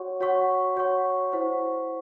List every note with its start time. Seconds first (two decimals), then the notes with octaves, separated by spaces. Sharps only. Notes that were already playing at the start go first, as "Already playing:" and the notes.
Already playing: F#4 C#5 F#5 C#6
0.20 F#4 C#5 F#5 C#6
0.76 F#4 C#5 F#5 C#6
1.32 E4 C5 F#5 C#6